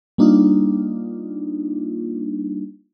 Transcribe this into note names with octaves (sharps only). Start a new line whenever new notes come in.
G3 A#3 D4 D#4 F4